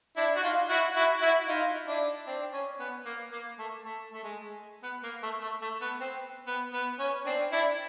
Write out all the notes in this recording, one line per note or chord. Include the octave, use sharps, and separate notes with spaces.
D4 E4
F#4
D#4 F4
E4 F#4
E4 F#4
E4 F#4
D#4 F4
D4 E4
C4 D4
C#4
B3
A#3
A#3
A3
A3
A3
G#3
B3
A#3
A3
A3
A3
B3
C4
B3
B3
C#4
C4 D4
D4 E4